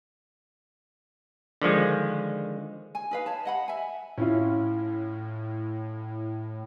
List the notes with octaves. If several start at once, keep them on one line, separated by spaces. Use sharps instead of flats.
D3 D#3 F3 G#3
G#5
D#4 B4 F5
C#5 A5
D#5 F#5 B5
E5 G#5
A2 C#4 E4 F4